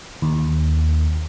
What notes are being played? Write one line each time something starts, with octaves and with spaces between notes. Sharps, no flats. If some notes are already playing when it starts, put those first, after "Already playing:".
D#2